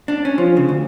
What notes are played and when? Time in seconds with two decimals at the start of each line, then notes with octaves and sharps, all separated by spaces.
0.08 D4
0.25 C#4
0.38 F3
0.57 C#3
0.69 D2